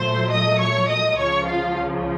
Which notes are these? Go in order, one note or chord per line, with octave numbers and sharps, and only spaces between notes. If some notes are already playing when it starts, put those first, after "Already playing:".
Already playing: A#2 F#3 A3 C5 C6
D#5 D#6
C#5 C#6
D#5 D#6
C#2 C#3 F3 C#5 C#6
F4 F5